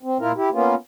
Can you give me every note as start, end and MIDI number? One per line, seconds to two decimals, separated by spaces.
0.03 0.17 60
0.20 0.32 46
0.20 0.32 64
0.20 0.32 65
0.20 0.32 70
0.36 0.49 64
0.36 0.49 67
0.52 0.75 58
0.52 0.75 59
0.52 0.75 61
0.52 0.75 65